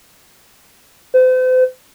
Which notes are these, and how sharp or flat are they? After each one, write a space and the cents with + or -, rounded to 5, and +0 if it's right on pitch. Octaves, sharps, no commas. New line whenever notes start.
C5 -40